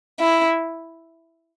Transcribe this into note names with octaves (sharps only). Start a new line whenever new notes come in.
E4